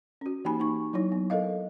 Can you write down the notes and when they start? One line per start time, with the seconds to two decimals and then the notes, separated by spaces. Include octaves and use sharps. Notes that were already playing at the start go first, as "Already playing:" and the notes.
0.21 C#4 F#4
0.45 E3 A#3 D#4 G4 G#5 B5
0.60 A#3 D#4 C#6
0.93 F#3 D#4 E4 C#5
1.12 B3
1.30 A4 A#4 D#5 F5